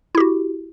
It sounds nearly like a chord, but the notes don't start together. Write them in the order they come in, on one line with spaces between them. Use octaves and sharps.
E4 G4 F#4